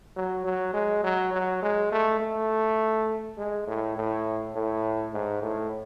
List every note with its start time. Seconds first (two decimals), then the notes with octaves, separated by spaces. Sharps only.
0.16 F#3
0.45 F#3
0.73 G#3
1.03 F#3
1.32 F#3
1.62 G#3
1.92 A3
2.20 A3
3.38 G#3
3.67 A2
3.96 A2
4.55 A2
5.13 G#2
5.42 A2